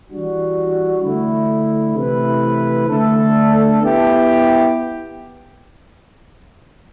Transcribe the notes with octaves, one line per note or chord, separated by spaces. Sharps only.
E3 G3 D4 F#4
D3 A3 E4
C3 E3 A3 E4 B4
D3 A3 D4 A4
B3 E4 G4